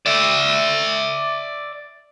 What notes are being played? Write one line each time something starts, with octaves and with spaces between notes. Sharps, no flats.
D5 E5